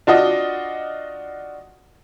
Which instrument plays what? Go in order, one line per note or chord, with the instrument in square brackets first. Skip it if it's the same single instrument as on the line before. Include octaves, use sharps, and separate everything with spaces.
[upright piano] D4 F4 F#4 D#5